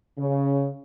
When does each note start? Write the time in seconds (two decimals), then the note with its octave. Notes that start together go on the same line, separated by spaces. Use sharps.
0.19 C#3